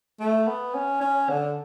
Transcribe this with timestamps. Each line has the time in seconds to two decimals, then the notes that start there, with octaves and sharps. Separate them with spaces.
0.20 A3
0.47 B3
0.75 C#4
1.01 C#4
1.29 D3